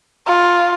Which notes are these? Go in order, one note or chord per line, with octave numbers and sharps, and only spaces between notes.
F4